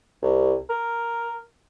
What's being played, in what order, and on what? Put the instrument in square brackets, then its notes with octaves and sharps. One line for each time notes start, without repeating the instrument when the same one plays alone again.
[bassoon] C2
A#4